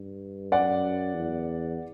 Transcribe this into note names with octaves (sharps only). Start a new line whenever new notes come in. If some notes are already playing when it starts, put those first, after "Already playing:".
Already playing: G2
F#2 D5 F#5
E2